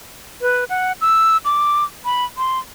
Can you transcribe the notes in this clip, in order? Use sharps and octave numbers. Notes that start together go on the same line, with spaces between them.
B4
F#5
E6
D6
B5
C6